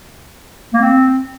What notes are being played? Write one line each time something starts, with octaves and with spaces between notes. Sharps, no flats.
A#3
C4